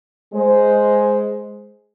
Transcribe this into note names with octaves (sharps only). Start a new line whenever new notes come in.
G#3 C5